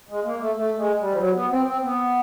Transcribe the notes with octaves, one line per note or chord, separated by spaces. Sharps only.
G#3
A#3
A3
A3
G#3
G3
F3
F#3
B3
C4
C4
B3